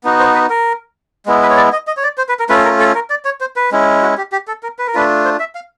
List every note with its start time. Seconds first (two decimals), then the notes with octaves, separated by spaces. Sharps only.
0.04 B3 D#4 F#4
0.20 C5
0.34 B4
0.50 A#4
1.26 G#3 B3 E4
1.42 B4
1.50 C#5
1.57 D5
1.72 D#5
1.87 D#5
1.97 C#5
2.03 D5
2.18 C5
2.29 B4
2.39 A#4
2.49 A3 C#4 F4 B4
2.64 A#4
2.79 A4
2.95 A#4
3.10 D5
3.25 C#5
3.41 C5
3.56 B4
3.72 G#3 C#4 E4
4.02 F#4
4.18 G4
4.32 G4
4.48 A4
4.63 A#4
4.79 B4
4.87 A#4
4.94 A3 D4 F4 B4
5.25 C5
5.40 E5
5.55 F5